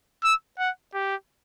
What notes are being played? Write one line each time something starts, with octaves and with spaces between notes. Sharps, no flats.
E6
F#5
G4